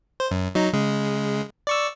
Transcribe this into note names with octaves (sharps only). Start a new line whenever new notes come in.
C5
F#2
F#3 D#4
C#3 G#3
D5 C#6 E6